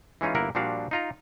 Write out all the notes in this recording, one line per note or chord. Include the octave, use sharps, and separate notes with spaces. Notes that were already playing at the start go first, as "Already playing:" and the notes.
E3 G#3 C#4 D#4 F4
G1 A#3 E4 A#4 F#5
A#2 F3 G3 D4 F#4 F5
D#4 F4 A#5